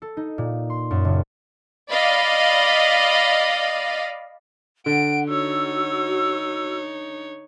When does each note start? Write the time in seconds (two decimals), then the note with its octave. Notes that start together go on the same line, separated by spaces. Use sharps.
0.02 A4
0.17 D#4
0.38 A#2
0.70 C6
0.91 F#2
1.05 F#1
1.91 D5 D#5 F5 B5
4.86 D3 F#5 D7
5.28 D#4 F#4 C#5 E6